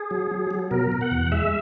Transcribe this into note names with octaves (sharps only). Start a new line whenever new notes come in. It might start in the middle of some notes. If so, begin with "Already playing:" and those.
Already playing: G#4
F#3
F#3
F#3
B2 A#4
B2
F#5
E2
G#3 E5